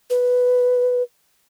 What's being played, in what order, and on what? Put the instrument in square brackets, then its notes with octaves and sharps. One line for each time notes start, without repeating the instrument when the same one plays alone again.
[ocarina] B4